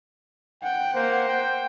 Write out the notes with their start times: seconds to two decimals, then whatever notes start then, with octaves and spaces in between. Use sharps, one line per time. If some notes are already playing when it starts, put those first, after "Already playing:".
0.63 F#5 G5
0.94 A#3 C5
1.29 G5